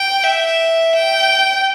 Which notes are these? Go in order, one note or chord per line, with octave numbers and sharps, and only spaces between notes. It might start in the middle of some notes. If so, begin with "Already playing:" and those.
Already playing: G5
E5
G5